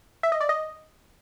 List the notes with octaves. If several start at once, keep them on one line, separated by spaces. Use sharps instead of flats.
E5
D#5
D5
D#5